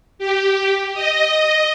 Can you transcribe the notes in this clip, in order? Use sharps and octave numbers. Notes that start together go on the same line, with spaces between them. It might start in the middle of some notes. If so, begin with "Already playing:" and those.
G4
D#5